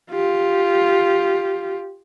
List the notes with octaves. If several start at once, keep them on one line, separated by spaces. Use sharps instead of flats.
F4 G4